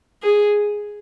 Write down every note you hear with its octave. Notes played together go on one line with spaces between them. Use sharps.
G#4